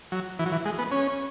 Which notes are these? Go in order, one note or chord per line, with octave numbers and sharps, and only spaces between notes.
F#3
E3
F#3
E3
G#3
B3
C#4